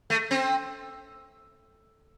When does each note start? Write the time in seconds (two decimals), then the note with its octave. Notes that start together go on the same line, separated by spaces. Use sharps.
0.10 A3
0.31 C4